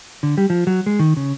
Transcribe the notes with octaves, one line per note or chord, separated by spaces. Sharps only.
D3
G3
F3
F#3
G#3
D#3
C#3